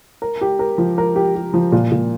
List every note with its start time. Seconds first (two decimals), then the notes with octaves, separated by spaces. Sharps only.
0.22 A#4
0.41 G4
0.59 A#4
0.78 F3
0.98 A#4
1.16 G4
1.36 G4
1.54 F3
1.72 A#2
1.91 A#2